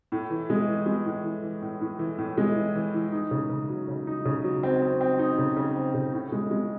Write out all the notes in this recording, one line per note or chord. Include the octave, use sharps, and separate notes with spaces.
A2
E3
G#3
E3
G#3
A2
E3
E3
A2
A2
E3
A2
G#3
E3
E3
E3
D#4
C#3
C#3
F#3
C#3
D#4
C#3
F#3
C4
C4
C4
D#4
C#3
C#3
C4
C#3
A2
G#3
G#3